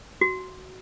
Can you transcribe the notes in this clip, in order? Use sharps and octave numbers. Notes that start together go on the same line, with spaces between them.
F#4